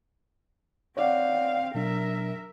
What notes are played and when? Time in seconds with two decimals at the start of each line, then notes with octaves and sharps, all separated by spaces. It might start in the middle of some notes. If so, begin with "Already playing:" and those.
0.97 C4 C#5 D5 F5 F#5
1.75 B2 F#3 D4 A#4 E5